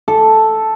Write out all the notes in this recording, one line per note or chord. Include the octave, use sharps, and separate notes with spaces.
A4